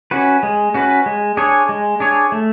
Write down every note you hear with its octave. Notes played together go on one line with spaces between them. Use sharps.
C#4 F#4 B4
G#3
C#4 F#4 B4
G#3
D4 G#4 C#5
G#3
D4 G#4 C#5
A3